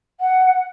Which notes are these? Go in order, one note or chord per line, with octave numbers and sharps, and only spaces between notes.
F#5